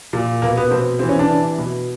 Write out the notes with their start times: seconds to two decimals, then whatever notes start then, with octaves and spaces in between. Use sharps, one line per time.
0.13 A#2
0.42 B2 A#3
0.57 B3
0.71 B2 C4
0.99 C3 E3 C4
1.09 C#4
1.19 D4
1.29 C3 E3
1.58 B2